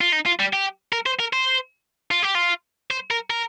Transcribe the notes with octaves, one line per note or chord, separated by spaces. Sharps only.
F4
D#4
F4
G3
G4
A#4
C5
A#4
C5
F4
G4
F4
C5
A#4
A#4